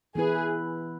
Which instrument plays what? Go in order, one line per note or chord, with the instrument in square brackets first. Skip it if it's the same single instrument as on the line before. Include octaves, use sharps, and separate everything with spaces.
[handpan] E3 B3 E4 B4 [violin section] G#4